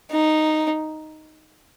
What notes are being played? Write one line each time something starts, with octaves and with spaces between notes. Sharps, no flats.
D#4